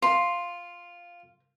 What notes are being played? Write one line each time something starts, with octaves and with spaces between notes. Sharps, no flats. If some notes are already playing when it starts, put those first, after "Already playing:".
F4 F5 C6